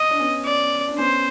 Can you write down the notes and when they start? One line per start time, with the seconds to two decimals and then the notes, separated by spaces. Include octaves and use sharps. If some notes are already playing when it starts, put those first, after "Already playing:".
Already playing: D#5
0.10 D4
0.19 B3 C#4
0.45 D5
0.88 D4
0.98 B3 C#4 C5